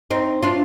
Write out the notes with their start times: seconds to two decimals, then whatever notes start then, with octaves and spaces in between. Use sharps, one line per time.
0.10 C4 D#4
0.43 D4 F4